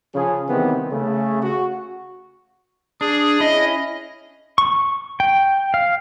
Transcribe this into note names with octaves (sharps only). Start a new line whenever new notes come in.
C#3 F3 C#4 G#4
C3 D#3 E3 G3 B3 C4
C#3 A3
F#4
D4 G#4
C#4 E4 D#5
C#6
G5
F5